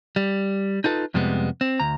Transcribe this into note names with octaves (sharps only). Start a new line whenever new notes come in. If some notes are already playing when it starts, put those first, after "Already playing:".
G3
D#4 F4 A4 B4
F2 C3 G3 G#3 B3
C4
D2 A#5